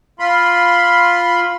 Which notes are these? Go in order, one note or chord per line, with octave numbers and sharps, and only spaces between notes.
F4 B5 C6